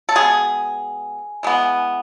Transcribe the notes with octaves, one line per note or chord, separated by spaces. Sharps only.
A4
B2 G#3 B3 G#4
E3 G#3 B3